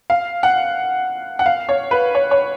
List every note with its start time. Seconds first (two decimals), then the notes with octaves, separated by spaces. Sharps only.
0.10 F5
0.43 F#5
1.39 F#5
1.46 F5
1.69 C#5
1.91 B4
2.15 C#5
2.31 C#5